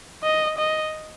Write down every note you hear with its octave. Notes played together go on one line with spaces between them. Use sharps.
D#5
D#5